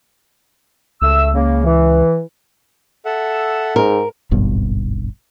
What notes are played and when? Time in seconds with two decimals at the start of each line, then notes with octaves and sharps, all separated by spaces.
1.02 C#2 A3 E6
1.34 C#3 A#3
1.64 E3
3.05 A4 E5 F#5
3.76 G#2 A#4
4.31 D1 G#1 G2 B2